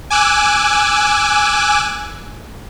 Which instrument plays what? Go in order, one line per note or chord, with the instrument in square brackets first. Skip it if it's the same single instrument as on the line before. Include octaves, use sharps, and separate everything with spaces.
[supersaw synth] G#5 D6 E6 F#6